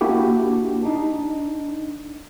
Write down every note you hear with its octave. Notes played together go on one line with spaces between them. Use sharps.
A#3 D4 E4 F#4 G4
D4 D#4